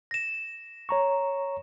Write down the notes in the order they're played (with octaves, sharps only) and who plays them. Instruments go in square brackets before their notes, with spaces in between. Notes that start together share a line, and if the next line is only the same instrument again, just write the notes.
[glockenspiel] A#6 E7
[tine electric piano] C#5 A#5 C#6